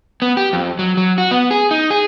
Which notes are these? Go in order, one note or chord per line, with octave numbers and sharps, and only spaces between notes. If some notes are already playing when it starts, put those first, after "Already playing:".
B3
G4
F2
F#3
F#3
F#4
B3
G#4
D#4
G#4